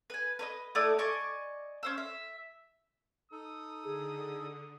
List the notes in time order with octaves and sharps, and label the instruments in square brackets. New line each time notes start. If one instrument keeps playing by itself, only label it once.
[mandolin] B4 G#5
B4 C#5 D#5
A3 E4 D5 D#6
D5 D#5 G#5 C#6
C#4 C5 E6
E5
[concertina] D#4 A4 [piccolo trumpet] D#6
[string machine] D3 [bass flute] G#4